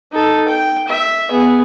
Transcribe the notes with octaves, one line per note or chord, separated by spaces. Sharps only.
D#4 A4
G5
E5
B3 G#4